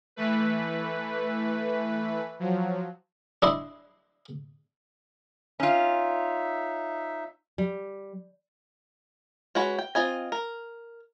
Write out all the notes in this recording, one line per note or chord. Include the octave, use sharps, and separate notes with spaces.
E3 A3 B4
F3 F#3
D4 E4 D#5 C6
C#4 D#4 F4 E5
G3
G#3 C#4 F#4 B4
G5
C4 F4 D#5 G#5
A#4